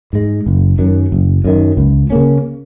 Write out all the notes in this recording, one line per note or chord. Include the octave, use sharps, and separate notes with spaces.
G#2 G#3
F#1
F#2 D#3
F#1
F#2 D#3
C#2
C#3 A#3 C#4